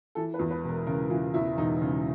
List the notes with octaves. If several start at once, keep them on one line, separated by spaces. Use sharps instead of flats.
E3 A4
B4
E2
B4
E1 A#4
C#3 A#4
E3 F4
E2 E4
E1 D#4
C#3